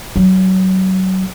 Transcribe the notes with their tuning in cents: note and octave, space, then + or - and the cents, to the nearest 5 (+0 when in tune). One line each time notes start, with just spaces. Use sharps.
F#3 +25